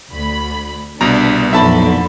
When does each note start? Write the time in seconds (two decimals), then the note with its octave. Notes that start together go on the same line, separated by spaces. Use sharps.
0.11 D2 B5
1.01 C2 B2 B3 D4 A#5
1.53 B1 F2 A#2 D3 E5 A5 B5